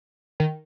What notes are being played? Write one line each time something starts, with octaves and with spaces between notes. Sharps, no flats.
D#3